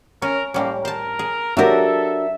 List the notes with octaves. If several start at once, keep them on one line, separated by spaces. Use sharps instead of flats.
C#4 A#4
A2 G3 A#3 C#4
A#4 C5 A5
G#4
F#3 D4 F#4 G4 A4 A#4 E5